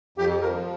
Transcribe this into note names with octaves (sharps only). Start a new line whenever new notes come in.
F2 G4
F3 A#4